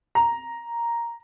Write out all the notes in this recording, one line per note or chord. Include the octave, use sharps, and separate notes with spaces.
A#5